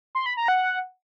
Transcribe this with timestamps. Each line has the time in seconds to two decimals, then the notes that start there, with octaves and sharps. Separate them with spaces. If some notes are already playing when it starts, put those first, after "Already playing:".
0.15 C6
0.26 B5
0.37 A#5
0.48 F#5